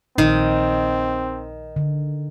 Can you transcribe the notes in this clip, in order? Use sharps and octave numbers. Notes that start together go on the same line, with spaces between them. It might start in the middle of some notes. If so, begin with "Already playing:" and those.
A#1 D#3 C4 D#4
D3